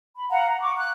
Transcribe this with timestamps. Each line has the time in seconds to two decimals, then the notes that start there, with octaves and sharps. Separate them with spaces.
0.15 B5
0.30 F5 F#5 A#5
0.48 A#5
0.61 C#6 D6
0.76 F#6